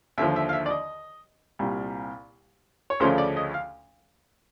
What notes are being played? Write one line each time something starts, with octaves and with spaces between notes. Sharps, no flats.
D#2 D3 F3 E5
E5
F5
E5
D5
D#5
C2 A#2 G3
C#5
D2 C#3 F3 A3 C#4 C5
D5
D#5
F5